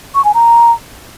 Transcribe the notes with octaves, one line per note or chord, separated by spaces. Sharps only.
C#6
G#5
A#5